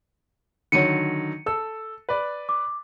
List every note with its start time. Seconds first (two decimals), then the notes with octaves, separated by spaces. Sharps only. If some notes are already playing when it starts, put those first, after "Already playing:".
0.72 D3 D#3 F#3 C#7 D#7
1.46 A4 E6
2.09 B4 D5
2.49 D6